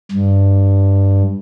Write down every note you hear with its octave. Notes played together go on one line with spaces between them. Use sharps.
G2